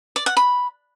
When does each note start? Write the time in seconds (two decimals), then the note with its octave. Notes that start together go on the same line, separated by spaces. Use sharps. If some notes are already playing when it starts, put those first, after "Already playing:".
0.16 D5
0.26 F#5
0.37 B5